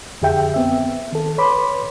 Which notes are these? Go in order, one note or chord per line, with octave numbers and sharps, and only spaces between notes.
F2 D3 G4 G#4 E5 G5
B3 C4 E5
D#3 A4
B4 C#5 B5 C6 D6